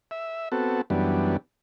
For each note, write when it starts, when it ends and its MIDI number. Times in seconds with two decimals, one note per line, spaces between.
0.11 0.49 76
0.52 0.81 59
0.52 0.81 60
0.52 0.81 66
0.52 0.81 69
0.90 1.37 42
0.90 1.37 52
0.90 1.37 55
0.90 1.37 59
0.90 1.37 62